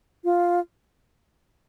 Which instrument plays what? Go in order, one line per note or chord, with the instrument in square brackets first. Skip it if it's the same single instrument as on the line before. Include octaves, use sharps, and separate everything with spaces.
[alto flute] F4